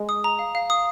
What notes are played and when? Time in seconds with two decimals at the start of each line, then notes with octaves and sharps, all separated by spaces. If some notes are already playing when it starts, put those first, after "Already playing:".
Already playing: G#3
0.09 D#6
0.24 A#5
0.39 F5
0.55 F5
0.70 D#6